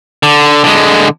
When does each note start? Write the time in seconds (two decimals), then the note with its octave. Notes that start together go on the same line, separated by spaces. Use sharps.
0.23 D3
0.64 D3 G#3